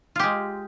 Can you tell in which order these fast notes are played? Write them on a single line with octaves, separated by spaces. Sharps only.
F4 G4 G#3